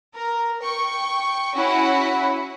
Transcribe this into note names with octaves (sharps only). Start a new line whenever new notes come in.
A#4
G5 C#6
C#4 E4 F#4 F#5